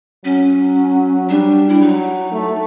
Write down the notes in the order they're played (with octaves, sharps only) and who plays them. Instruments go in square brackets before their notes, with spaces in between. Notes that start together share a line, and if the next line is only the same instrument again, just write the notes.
[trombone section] F#3 [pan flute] C#4
[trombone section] G3 [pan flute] D4
[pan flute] E4
[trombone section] F#3 [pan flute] D#4
[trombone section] A3